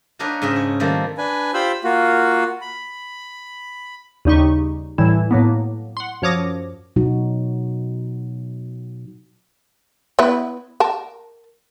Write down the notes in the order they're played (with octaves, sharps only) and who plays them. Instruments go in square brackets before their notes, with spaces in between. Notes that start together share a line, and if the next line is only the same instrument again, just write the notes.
[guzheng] A#3 D4 D#4 A#4 B4 C#5
G#2 C#3 C#4 D#5 E5
G#4
D#3 G3 A3 A#3 C4 F4
[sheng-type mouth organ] D4 B4 G#5
F4 G4 C5 B5 E6
A#3 F4 F#4
B5
[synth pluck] D#2 C#3 G3 D#4 G4 C#6
A2 E3 G3 E4
A2 F#3 A#3 B3
F#5 C6
F#2 F3 C#5 D6 D#6 A#6
[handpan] B2 F#3 D#4 F#4
[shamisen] B3 E4 B4
A#4 A5